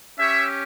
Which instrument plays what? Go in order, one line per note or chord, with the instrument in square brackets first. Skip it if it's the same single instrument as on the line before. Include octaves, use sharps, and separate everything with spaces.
[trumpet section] C#4 G4 C#5 E5